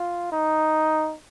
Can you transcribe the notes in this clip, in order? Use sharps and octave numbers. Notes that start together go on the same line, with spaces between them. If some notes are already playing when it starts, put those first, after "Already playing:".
Already playing: F4
D#4